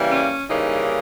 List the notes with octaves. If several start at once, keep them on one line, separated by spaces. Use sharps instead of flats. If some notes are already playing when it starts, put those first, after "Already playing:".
Already playing: C#3 E3 G3 A#3
C#4
C#3 E3 G3 A#3 D#4